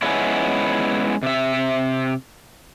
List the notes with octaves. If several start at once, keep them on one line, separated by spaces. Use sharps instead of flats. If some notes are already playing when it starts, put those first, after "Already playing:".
G#3 B3 C#4 E4
C3 E5